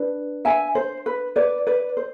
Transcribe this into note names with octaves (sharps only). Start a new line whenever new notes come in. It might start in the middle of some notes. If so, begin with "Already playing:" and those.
Already playing: D4 B4
E5 G#5
C5
B4
B4 D5
B4 D5
C5